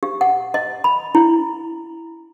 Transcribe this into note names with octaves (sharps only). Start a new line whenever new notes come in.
G4
F#5
D#5
B5
E4